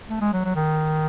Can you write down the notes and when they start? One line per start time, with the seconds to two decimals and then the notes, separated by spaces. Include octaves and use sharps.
0.10 A3
0.21 G#3
0.33 F#3
0.45 F#3
0.56 D#3